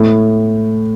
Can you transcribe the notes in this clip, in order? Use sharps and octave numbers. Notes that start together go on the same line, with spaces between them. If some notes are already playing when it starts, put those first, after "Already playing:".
Already playing: A2